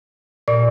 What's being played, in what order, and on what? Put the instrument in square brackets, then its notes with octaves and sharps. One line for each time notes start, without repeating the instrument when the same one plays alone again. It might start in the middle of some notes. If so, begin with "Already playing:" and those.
[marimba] A#2 D5